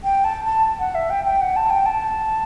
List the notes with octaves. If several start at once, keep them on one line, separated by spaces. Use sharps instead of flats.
G5
A5
A5
F#5
E5
G5
G5
F#5
A5
G5
A5